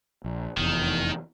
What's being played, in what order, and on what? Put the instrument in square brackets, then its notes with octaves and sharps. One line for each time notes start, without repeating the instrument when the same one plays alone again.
[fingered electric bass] A#1
[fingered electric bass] F1 E2 [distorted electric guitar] D#3